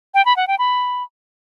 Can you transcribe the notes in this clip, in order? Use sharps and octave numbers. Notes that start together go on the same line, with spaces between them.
G5
B5
F#5
G5
B5